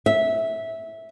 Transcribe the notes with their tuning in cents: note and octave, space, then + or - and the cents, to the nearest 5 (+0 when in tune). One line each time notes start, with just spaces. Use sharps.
E5 -10